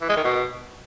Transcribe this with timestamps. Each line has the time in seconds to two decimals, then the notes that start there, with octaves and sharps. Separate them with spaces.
0.01 E3
0.09 G#3
0.17 D#3
0.24 B2